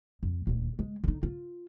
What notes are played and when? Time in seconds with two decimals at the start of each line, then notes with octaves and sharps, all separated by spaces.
0.23 F2
0.47 D#1 D2
0.79 G#3
1.04 D3 D#4
1.23 F4